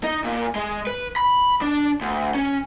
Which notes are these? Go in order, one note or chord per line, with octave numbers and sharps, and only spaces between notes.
D#4
A#2
G#3
B4
B5
D4
D2
C#4